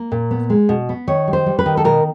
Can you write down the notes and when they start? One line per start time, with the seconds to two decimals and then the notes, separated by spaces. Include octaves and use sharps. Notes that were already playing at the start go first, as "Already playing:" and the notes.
Already playing: A#3
0.12 A#2
0.31 B3
0.50 G#3
0.69 B2
0.89 B3
1.07 D#3 C#5
1.28 G3
1.33 C5
1.46 G3
1.59 B4
1.66 D#3
1.77 A4
1.85 B2 A#4